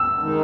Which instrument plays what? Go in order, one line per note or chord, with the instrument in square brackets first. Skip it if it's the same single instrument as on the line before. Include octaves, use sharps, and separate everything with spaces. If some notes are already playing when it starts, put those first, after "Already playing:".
Already playing: [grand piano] E6
[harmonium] D#3 G#3 D#4